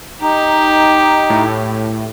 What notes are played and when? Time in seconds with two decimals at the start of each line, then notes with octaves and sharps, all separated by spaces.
0.22 D#4 G4
1.30 A2